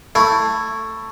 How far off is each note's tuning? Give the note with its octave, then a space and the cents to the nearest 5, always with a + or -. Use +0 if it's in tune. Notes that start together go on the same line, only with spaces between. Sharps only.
A3 +15 E4 +0